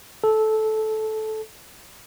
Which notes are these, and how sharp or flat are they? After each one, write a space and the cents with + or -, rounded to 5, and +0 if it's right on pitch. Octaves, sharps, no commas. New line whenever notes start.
A4 -15